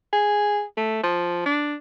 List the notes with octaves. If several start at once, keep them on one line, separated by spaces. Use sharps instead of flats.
G#4
A3
F3
D4